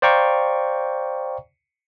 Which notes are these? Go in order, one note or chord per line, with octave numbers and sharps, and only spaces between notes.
C5 D5 F5 G5 A#5 C#6